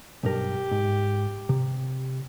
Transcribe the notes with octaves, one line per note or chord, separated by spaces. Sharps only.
B1 G2 G4 A#4
G#2
C3